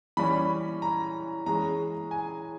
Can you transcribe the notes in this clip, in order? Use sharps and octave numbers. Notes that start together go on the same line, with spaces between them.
E3 G3 C#4 B5
A#5
E3 G#3 C#4 A#5
G#5